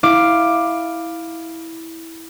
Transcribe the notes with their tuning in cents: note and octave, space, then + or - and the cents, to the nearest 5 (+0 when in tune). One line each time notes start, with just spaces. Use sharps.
E4 -10 F5 +0 D6 +10